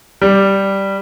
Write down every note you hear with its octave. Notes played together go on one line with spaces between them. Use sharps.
G3